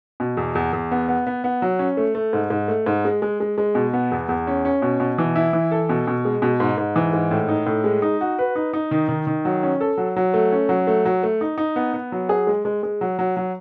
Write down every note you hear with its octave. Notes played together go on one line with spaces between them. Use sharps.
B2
E2
E2
E2
B3
B3
B3
B3
F#3
C#4
A3
A3
G#2
G#2
A3
G#2
G#3
G#3
G#3
G#3
B2
B3
E2
E2
C#4
C#4
B2
B2
E3
E4
E3
A4
B2
B2
G#3
B2
G#2
G#2
E3
G#2
A2
D#4
A2
G#3
D#4
F#4
B4
D#4
D#4
D#3
D#3
D#3
F#3
C#4
A4
F#3
F#3
A3
C#4
F#3
A3
F#3
A3
D#4
D#4
B3
B3
F#3
G#4
G#3
G#3
G#3
F#3
F#3
F#3